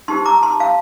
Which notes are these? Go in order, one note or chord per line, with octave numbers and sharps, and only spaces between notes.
D#4 G4 C5 A5 C6
A#5 D6
A5 C6
F5 A5